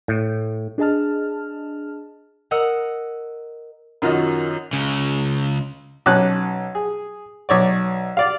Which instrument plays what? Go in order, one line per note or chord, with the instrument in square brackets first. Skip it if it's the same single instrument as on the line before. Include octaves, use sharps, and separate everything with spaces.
[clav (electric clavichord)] A2
[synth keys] D4 G#4 D#5 A5 F6
[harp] A#4 D#5 F#5 E6
[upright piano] F#2 D#3 F4 F#4 D#5
[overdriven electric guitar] C#2 C#3
[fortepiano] B1 C#4 A5 F#6
G#4
B1 C#5 D5
D5 F5